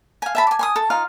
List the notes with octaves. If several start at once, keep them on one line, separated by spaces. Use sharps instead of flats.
F5 G#5
E5 A5 B5
D5 G#5
G#5 C6 D#6
A4
D#4 F4 F5